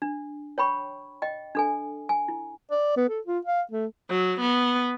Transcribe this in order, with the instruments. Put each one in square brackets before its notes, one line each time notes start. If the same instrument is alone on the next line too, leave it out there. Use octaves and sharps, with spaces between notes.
[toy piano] D4
C#5 G5 B5 C#6
D#5 G5
D4 A4 G#5
G#5
E4
[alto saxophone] D5
B3
A4
F4
F5
A3
[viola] F#3
B3